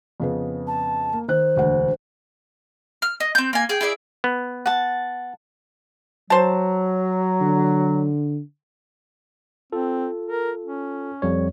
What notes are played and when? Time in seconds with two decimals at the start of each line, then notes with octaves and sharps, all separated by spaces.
0.20 F2 C#3 B3
0.67 A5
1.13 A#3
1.28 D#3 C5 F#6
1.56 E1 D2 F#5
3.02 F6
3.20 D#5
3.35 C4 G6
3.53 A#3 G#5
3.69 G#4 G5
3.81 E4 G#4 D5 E5
4.24 B3
4.66 F#5 A5
6.30 F#3 C5 A5
7.41 D3
9.72 C4 F4 A4
10.26 A#4
10.64 C#4
11.22 F2 G3 C#5